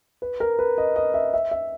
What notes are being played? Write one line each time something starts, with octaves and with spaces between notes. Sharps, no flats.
B4
A#4
B4
D#5
D#5
E5
E5
E5